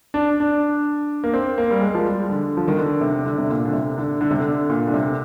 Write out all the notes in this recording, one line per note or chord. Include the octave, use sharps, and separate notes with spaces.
D4
D4
A#3
C4
A#3
G3
G#3
F3
G3
D3
F3
D#3
D3
C3
D3
C3
A#2
D3
C3
D3
D3
C3
D3
A#2
D3
C3